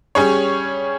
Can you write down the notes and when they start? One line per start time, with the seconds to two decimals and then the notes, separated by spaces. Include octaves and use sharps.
0.15 G3 C#4 G#4 C#5